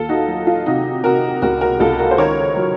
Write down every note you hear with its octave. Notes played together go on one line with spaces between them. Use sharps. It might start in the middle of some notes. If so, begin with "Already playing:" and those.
Already playing: D#2 F4 A4
D#4 F#4
F#3
F4
C3 D#4 F#4
C3 F#4 A#4
C#2 F#4 A#4
F#4 A#4
C#2 F4 A4
F#4 A#4
C5
D#3 A#4 C#5
F#3